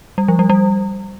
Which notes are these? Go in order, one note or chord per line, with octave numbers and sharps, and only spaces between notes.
G3
F3
G3
G3